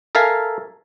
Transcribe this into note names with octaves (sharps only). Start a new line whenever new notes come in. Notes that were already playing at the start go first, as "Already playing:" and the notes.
A4 A#4 E5 F5 G#5